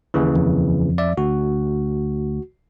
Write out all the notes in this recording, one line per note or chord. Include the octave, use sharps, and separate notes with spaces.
D#2 C#3 E3
F2
D5 E5
D2 F#4